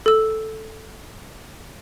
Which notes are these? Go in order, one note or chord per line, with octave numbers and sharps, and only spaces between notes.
A4 E6